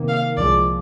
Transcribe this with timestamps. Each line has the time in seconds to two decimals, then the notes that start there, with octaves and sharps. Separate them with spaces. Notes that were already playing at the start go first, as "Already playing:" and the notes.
Already playing: C3 D#3 A#3
0.08 F5
0.37 C2 A#2 F3 G#3 D5